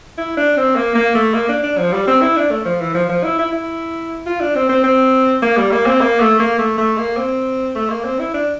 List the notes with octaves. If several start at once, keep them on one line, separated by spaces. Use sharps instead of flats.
E4
D4
C4
A#3
A#3
A3
A#3
D4
D4
F3
G3
C4
E4
D4
A3
F3
E3
F3
F3
E4
E4
E4
F4
D4
C4
C4
C4
A#3
G3
A#3
C4
A#3
A3
A#3
A3
A3
A#3
C4
A3
A#3
C4
E4
D4